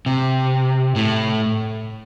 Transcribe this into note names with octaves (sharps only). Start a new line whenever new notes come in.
C3
A2